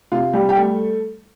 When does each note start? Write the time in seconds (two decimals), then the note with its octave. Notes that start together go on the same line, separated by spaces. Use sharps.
0.12 C3 F4
0.33 G3 G4
0.49 G4
0.55 G3 A3 A4